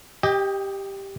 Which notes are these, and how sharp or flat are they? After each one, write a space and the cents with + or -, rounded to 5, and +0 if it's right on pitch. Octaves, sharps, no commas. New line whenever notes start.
G4 +0 D#5 +0 G5 +35